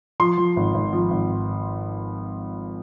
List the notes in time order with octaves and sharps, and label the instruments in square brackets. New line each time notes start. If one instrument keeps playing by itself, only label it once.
[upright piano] F3 C6
F3
G#1
G#1
F3
G#1